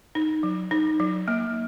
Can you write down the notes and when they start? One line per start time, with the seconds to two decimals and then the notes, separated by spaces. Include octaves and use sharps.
0.15 D#4
0.43 F#3
0.71 D#4
1.00 F#3
1.28 A#3